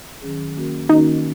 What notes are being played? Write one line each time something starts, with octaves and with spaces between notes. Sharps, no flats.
D#3 F#3 C#4 G#4
D#3 A#3 C#4 F#4 A#4
D#3 A#3 C#4 D#4 F#4 A#4